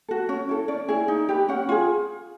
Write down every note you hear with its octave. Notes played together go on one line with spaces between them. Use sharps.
F#4 A4
C#4
E4 A4
C#4 D5
E4 G#4
D#4
G4 B4
C#4 F#5
F4 G#4